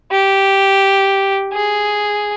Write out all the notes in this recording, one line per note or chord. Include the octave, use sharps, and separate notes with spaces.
G4
G#4